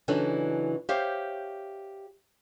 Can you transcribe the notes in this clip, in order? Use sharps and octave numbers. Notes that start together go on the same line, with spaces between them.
C#3 E3 F#3 D4 D#4 A4
G4 C5 C#5 E5 F5